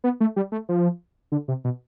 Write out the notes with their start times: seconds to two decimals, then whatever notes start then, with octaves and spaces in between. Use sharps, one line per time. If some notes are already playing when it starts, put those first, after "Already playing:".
0.04 B3
0.21 A3
0.36 G3
0.52 A3
0.69 F3
1.32 D3
1.48 C3
1.64 B2